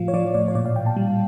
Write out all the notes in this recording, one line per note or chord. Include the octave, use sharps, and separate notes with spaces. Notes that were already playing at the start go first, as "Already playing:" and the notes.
Already playing: A2 F3 F5
C#5
F3 D5
A2 D5
C#5
A#2 D5
F5
A#2 G5
A5
G3